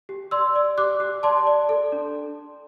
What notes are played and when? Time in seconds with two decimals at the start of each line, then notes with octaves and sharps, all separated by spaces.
0.09 G4
0.31 D5 C6 E6
0.56 D5
0.78 G4 D6 F#6
1.00 G4
1.23 D5 A5 C6
1.47 D5
1.69 A4
1.92 D4